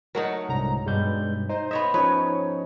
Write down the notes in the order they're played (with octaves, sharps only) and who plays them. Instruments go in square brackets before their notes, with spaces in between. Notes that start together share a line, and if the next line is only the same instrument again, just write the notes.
[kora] F#3 A3 D#4 [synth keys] A#4 F#5
[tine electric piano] C2 G#2 [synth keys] D3 A#5
[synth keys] G2 B2 G3 [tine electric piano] G#3 G6
[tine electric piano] D#4 [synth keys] C5
[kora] B3 C#5 E5 [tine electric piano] D#5
[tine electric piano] F3 C#4 [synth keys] D#4 C#5 [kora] B4